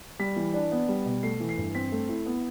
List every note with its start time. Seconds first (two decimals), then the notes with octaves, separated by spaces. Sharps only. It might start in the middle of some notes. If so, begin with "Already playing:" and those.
0.19 G3 B6
0.36 E3
0.54 D4
0.72 B3
0.89 G3
1.06 B2
1.23 A3 C7
1.40 E3
1.49 C7
1.58 G2
1.75 C4 B6
1.92 A3
2.09 E4
2.26 B3